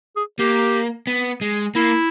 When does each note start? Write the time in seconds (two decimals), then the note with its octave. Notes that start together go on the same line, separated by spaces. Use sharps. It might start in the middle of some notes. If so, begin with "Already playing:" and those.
0.16 G#4
0.39 A#3 G4
1.07 B3
1.41 G#3
1.75 A#3 E4